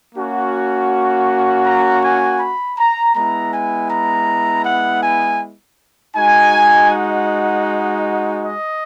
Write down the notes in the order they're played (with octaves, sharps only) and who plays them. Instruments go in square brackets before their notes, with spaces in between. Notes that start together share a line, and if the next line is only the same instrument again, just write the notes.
[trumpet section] A#3 C#4 F#4
A#5
G#5
B5
A#5
G#3 B3 E4 A#5
G#5
A#5
F#5
G#5
G#3 D#4 F#4 G#5
F#5
D#5